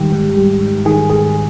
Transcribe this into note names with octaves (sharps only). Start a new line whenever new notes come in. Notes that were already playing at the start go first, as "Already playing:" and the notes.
Already playing: G#2 D#3 G3 G4
G#2
G3
G#2
D#3 G#4
G#2 G#4